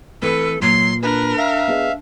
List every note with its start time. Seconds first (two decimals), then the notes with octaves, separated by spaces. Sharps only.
0.22 E3 A3 C4 A4 B4
0.62 A#2 F#3 C6
1.03 D4 A#4 B4
1.38 E5 F5
1.68 B3 G#4 D#5